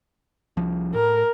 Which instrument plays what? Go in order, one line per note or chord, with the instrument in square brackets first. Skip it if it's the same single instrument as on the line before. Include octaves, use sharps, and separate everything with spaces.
[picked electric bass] C2 F3
[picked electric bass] A2 [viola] A#4